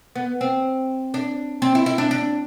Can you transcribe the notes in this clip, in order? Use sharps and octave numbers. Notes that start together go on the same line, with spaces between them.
B3
C4
D4
C4
E4
E4
D4
D4